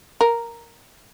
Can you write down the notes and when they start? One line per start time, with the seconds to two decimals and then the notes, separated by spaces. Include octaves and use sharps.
0.21 A#4